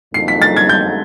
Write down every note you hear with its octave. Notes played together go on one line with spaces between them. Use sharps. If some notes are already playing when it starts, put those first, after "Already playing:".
F2 D3 F#3 A#3 D#4 C7
B6
A6
G#6
G6